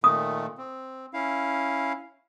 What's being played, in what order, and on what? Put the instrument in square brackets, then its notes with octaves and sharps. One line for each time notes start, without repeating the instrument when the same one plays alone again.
[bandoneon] A#2 D#3 A3 [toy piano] D#6
[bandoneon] C4
C#4 E4 F5